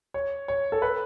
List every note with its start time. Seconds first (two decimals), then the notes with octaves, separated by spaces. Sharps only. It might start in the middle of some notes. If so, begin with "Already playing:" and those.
0.14 C#5
0.48 C#5
0.72 A4
0.82 B4